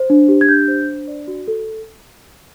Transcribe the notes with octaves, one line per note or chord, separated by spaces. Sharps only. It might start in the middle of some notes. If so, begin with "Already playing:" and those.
Already playing: C5
D4
G4
G#6
D4 G6
C5
D4
D5
F#4
A4